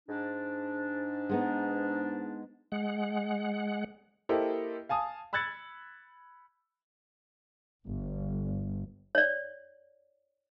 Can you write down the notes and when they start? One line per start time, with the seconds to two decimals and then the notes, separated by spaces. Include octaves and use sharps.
0.08 G#2 D4
1.29 G#3 B3 D#4
2.72 G#3 F#5
4.29 A#3 E4 G4 A4 C5 D#5
4.89 F5 G#5 A5 D#6
5.33 B5 E6 F#6 G#6 A6 C#7
7.87 G1
9.15 C#5 D5